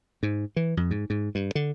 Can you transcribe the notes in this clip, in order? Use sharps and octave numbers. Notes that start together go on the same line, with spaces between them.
G#2
E3
F2
G#2
G#2
G2
D3